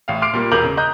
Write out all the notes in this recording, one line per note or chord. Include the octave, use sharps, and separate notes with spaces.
A1 A2 F5
C6 D6 F6 C7 D7
A#2 G3 A#3
E1 A#4 D6 G6 F7 F#7
C#3
D#5 A#5 F#6 G6